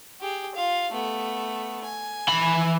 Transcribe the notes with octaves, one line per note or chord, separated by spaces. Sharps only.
G4 G#4
F4 F5
A3 B3
G#5
E3 B5